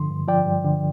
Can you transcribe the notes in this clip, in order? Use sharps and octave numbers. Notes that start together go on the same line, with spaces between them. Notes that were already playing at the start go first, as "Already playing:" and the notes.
Already playing: G2 D3 F3 C6
G2
F3 D5 G5
G2
D3